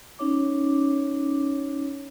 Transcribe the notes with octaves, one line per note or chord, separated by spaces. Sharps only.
C#4 D#4 C#5 D6